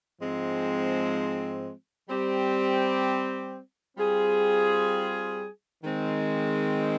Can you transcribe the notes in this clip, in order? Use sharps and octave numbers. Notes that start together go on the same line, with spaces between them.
G#2 F3 G#3 C4
G3 C4 G4
G3 C4 F4 G#4
D#3 G#3 C4